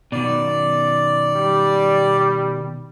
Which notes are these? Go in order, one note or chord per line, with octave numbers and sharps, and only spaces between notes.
B2 D#3 D5
G3